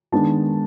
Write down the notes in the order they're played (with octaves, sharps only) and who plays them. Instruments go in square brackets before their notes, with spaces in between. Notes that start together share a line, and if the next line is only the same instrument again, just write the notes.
[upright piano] D#3 G#3 B3 D4 A5